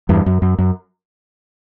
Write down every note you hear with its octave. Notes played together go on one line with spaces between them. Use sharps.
E2 G2
F#2
F#2
F#2